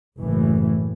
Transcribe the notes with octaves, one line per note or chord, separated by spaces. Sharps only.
F#1 A2 E3